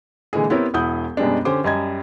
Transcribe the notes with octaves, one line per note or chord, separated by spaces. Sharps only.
A#2 D3 E3 G#3 G#4
B3 C4 E4 G4 A#4 C#5
E1 E4 F#5 D#6 G6
F#2 B2 G3 G#3 B3 D4
D3 C#4 G4 C5 D6
F#2 G3 D#5 G#6